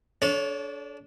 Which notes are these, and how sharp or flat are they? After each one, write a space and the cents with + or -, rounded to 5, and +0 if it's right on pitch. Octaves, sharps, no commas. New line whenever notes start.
D4 -20 A4 -30 C#5 +10